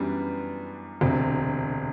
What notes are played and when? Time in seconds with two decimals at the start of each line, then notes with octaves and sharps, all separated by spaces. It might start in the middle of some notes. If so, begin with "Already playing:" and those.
Already playing: F#2 E3 G3 B3 D4
1.01 E1 D2 C3